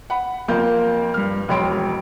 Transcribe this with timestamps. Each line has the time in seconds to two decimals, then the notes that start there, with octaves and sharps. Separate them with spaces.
0.10 F#5 B5
0.48 F2 A#3 F4 A#4 G6
1.14 G2 F6
1.49 E1 F2 C#5 B5 C6 D7